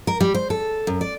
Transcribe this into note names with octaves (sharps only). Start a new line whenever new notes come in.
A#4
G3
C5
A4
F#2
D5